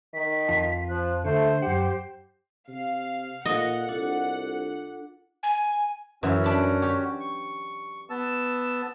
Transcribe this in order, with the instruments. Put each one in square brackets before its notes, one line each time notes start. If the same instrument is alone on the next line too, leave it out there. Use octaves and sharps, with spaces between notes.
[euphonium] D#3 [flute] B6
[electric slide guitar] F2 F4 A5
[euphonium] F3 [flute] F#6
[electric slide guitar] D3 [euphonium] A3 [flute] C5
[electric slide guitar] F#2 F#5 [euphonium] G4
[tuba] C3 [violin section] F5
[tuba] A#2 [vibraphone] F4 A4 F5 [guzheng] D#5 [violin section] F#5
[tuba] C2 [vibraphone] D4 F4 A4
[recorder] G#5
[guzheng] F#2 E3 [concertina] C#4 F#4
[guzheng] D4 B5
G4 C#5
[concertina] C#6
B3 A5 E6